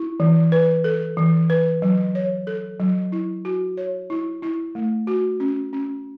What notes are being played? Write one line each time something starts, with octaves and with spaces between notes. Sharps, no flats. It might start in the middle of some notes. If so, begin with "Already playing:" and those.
Already playing: E4
E3
B4
A4
E3
B4
F#3
C#5
A4
F#3
E4
F#4
C#5
E4
E4
A3
F#4
C#4
C#4